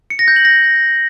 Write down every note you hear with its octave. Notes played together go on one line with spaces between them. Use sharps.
C#7
A#6
G6
F#7
A#6